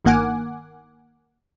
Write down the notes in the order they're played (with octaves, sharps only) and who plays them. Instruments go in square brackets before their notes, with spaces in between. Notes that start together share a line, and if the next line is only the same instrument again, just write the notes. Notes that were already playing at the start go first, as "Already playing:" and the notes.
[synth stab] G1 D#3 A#3 F#5 G#5 D6